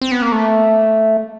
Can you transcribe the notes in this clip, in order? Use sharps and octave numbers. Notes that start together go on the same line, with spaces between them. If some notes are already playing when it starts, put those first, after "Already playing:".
C4
B3
A#3
A3